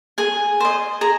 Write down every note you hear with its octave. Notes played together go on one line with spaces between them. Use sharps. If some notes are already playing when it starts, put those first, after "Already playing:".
G#4 G#5
C5 D#5
G#4 A#5